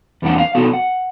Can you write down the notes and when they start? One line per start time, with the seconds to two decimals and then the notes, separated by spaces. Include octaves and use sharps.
0.22 E2 G3 A#3 C4 D4 F#5
0.38 F5
0.55 B3 D4 F#4 A4
0.73 F#5